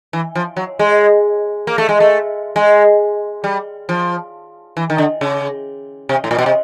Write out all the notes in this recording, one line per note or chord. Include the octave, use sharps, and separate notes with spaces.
E3
F3
F#3
G#3
A#3
A3
G#3
A3
G#3
G3
F3
E3
D#3
D3
C#3
C3
A2
A#2
B2
C3